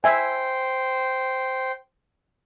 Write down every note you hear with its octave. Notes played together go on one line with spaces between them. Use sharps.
C5 E5 G5 G#5